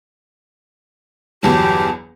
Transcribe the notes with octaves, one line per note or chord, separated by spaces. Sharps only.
G1 E2 F#3 G4 A5